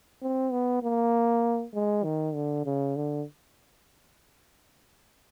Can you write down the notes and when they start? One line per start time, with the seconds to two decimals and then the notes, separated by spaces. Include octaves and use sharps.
0.22 C4
0.52 B3
0.83 A#3
1.74 G#3
2.04 D#3
2.35 D3
2.65 C#3
2.96 D3